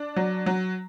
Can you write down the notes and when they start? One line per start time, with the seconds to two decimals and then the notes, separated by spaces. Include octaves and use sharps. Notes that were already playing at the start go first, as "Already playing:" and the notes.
Already playing: D4
0.16 F#3
0.46 F#3